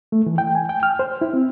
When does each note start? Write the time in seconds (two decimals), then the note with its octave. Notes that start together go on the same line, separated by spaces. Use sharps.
0.12 A3
0.26 E3
0.38 G5
0.55 G#5
0.69 G5
0.83 F6
0.99 C5
1.21 E4
1.33 C4